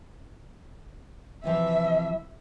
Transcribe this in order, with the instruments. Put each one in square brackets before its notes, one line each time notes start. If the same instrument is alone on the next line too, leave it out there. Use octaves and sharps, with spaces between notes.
[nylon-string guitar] C3 E3 F3 [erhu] E5